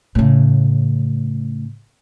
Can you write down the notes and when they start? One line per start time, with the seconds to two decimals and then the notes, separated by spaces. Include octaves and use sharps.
0.15 A2 C#3